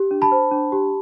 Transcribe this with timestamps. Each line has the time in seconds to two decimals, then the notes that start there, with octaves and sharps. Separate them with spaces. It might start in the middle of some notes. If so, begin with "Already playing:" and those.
Already playing: G4
0.11 D4
0.22 A5 B5
0.32 C5
0.51 D4
0.72 G4